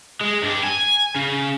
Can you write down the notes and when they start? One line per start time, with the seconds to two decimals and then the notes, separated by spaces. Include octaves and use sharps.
0.21 G#3
0.43 G2 D4
0.64 G#5
1.16 C#3